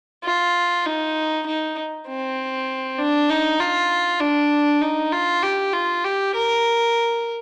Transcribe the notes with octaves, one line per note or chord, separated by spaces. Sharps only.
F4
D#4
D#4
C4
D4
D#4
F4
D4
D#4
F4
G4
F4
G4
A#4